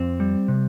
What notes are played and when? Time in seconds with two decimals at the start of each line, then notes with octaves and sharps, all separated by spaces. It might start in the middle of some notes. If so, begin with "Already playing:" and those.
Already playing: F2 C4
0.20 G3
0.48 C3